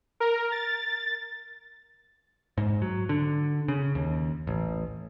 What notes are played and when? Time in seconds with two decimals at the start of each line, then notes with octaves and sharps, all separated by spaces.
0.20 A#4
0.52 A6
2.58 G#2
2.82 F#3
3.09 D3
3.68 C#3
3.95 D#2
4.47 A1